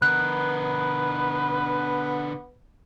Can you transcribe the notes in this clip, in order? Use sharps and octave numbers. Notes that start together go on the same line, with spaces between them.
D3 B3 A#4 B4 F#6